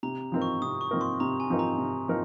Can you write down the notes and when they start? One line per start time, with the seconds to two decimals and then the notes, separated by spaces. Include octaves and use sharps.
0.03 C3 A#5
0.32 F3 C4 D#4 A#4
0.42 C#6
0.62 C3 D#6
0.81 C#6
0.91 F3 C4 D#4 A#4
1.01 C6
1.20 C3 A#5
1.40 G#5
1.50 F3 C4 D#4 A#4
1.59 A#5
1.78 C3
2.08 F3 C4 D#4 A#4